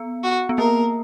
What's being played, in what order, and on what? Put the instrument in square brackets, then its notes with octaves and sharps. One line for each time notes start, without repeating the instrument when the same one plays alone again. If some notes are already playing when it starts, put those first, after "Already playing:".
Already playing: [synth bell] B3
[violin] F#4
[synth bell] B3
[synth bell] A#3 [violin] A#4